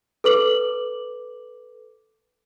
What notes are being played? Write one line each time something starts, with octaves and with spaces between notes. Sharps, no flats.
A4 B4 D6 F#7